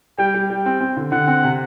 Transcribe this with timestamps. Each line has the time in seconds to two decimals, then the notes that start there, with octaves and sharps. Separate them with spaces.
0.18 G3 G5
0.34 G3
0.49 G3 G5
0.66 C4
0.80 C4
0.97 D3
1.12 D3 F#5
1.27 C4
1.44 C3